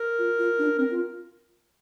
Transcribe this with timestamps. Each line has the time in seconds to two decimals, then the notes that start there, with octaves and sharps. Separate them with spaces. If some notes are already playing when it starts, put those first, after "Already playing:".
Already playing: A#4
0.19 F4
0.39 F4
0.59 D4
0.78 C4 A#4
0.91 F4